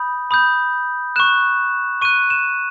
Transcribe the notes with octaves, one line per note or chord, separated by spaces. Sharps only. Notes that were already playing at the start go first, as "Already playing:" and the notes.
Already playing: B5 D#6 G6
B5 D#6 G6
C#6 F#6 E7
C#6 F#6 D#7
E7